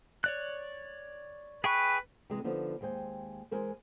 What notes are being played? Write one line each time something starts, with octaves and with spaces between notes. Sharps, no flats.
C#5 D5 F#6
G#4 B4 G5 C#6
C3 E3 G#3
D3 F3 B3 D#4
D#2 G#3 C5 G5
E3 G#3 A#4 C5